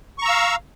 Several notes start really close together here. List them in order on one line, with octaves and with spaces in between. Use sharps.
C#6 A#5 E6 F5